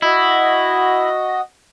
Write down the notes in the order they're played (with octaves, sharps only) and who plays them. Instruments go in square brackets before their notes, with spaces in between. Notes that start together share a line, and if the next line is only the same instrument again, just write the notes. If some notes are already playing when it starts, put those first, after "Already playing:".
[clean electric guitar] E4 [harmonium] F#4 D#5